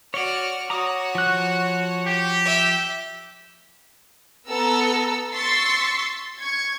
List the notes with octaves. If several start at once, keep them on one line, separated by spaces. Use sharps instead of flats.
F#4 C#5 D5 F6
F#4 C#5 A#5 D6 D#6
F3 F#6
G4
E5
B3 A4 A#5 E6
C6 C#6 E6 A6 B6 C7
C#6 G#6